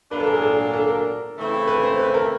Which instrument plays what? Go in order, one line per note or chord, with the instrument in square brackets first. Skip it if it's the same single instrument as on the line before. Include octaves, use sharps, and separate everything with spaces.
[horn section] A#2 F#3 A#3 D4 [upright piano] B4
[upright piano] A4
A#4
G#4
A4
A4
A#4
[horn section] C#3 E3 A3 C4 E4
[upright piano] B4
C5
B4
A#4